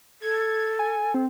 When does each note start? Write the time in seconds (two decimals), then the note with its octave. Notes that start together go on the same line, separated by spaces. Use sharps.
0.22 A4 G#6
0.79 G#5
1.14 C4